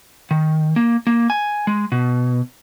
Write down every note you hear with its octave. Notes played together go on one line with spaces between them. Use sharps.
D#3
A#3
A#3
G#5
G#3
B2